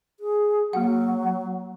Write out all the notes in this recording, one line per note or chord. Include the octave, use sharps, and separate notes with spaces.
G#4
F#3 A#3 F#4 F#5